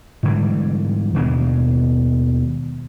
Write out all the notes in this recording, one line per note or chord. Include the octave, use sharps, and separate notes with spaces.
G#2 D3 E3 G3
D#2 B2 G#3 D4